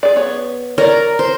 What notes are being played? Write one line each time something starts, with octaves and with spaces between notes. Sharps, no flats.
G#4 D5
B3 C#5
A#4 C#5 D5
C5